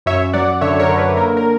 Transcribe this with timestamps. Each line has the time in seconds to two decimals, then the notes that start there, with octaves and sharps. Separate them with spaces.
0.06 F#2 C#5 E5
0.33 F#3 D5 F#5
0.61 D3 C#5 E5
0.80 A#4 C#5
0.89 D3
0.98 B4
1.17 A#3 A#4
1.37 A#4